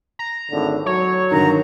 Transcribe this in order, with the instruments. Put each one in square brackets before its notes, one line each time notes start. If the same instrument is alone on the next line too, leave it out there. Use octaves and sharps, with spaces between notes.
[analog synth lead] A#5
[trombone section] G#1 A2 D3
[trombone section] F#3 [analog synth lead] C#5
[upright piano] G2 D3 D#3 [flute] A#5